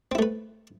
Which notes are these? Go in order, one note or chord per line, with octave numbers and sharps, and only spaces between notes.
A3 C4 E4 B4